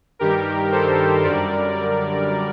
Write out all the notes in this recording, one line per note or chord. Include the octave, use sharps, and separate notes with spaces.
G2 D#3 G3 G4 A#4
A4 C5
F#2 D3 G3 A#4 D5